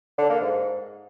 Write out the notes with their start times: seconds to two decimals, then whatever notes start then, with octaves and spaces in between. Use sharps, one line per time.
0.18 D3
0.30 A#3
0.41 G#2